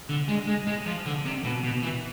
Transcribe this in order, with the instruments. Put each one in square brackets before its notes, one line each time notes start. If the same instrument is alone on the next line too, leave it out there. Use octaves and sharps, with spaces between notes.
[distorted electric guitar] D3
G#3
G#3
G#3
F3
D3
C3
B2
B2
E3